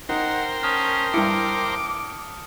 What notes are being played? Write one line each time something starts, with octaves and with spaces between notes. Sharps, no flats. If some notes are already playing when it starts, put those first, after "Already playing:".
D#4 A#4 C5 F#5 G5
C#4 A5 D#6 F6
G2 E4 D6 C#7